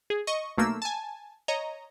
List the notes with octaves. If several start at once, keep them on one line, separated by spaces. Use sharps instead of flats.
G#4
D#5 C#6
B1 A3 A#3 E6
G#5 A5
C#5 D#5 A#5